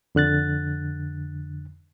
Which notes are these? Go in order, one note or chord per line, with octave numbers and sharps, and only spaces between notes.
F2 D3 F#6 A6